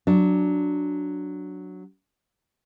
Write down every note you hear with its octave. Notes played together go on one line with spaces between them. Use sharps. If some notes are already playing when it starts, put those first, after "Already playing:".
F#3 D4